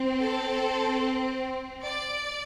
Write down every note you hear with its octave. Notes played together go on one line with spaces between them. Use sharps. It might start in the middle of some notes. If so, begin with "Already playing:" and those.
Already playing: C4
A4
D5